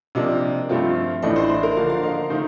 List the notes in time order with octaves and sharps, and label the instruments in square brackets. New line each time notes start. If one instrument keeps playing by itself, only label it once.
[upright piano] C3 F3 A#3 D4 [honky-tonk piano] D#5
[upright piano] G2 F3 A3 C4 F4
[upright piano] A1 A2 A3 D4 [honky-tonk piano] D#5
[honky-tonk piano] C5
C5
A#4
[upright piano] D3 F3 A#3 [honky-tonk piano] F5
[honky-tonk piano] F5
D#5
[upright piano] D#3 A3 D#4 [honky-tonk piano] C5